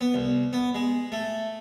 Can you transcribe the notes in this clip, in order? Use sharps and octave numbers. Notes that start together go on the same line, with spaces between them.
B3
C2
B3
G#3
A3